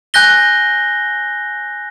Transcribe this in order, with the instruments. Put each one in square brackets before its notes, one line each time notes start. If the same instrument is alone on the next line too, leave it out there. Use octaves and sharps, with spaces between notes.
[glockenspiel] G#5 F#6 G6 A#6 G7